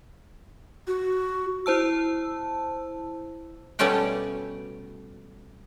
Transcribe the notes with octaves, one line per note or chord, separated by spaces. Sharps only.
F#4
E4 C5 A5 E6
B2 G3 A3 C#4 G4 G5